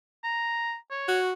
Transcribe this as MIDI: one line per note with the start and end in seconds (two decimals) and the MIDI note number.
0.24 0.76 82
0.91 1.20 73
1.08 1.33 66